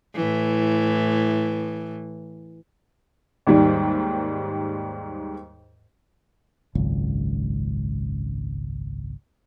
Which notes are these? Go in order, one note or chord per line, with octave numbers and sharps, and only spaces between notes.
A2 E3
D#2 G#2 D#3 G3
G#1 C#2 F#2